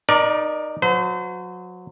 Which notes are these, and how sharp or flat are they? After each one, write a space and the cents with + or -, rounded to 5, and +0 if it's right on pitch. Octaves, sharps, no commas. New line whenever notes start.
D#4 -20 A#4 +30 D5 +0
F#3 -25 C5 -45